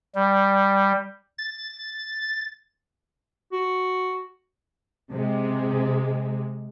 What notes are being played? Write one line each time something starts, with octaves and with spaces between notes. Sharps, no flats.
G3
A6
F#4
C3 G#3